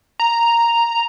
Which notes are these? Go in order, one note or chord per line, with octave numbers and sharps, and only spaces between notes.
A#5